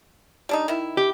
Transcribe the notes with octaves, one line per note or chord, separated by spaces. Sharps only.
G3 D4 D#4
D#3 E4
G4